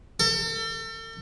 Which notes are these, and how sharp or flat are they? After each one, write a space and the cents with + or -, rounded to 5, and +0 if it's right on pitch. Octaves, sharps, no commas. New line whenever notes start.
A4 +40